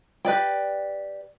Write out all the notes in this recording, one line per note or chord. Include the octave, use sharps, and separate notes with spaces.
G4 B4 D5 G5